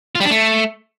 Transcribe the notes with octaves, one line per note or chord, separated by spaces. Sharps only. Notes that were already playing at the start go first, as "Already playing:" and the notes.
F4
G3
D4
A3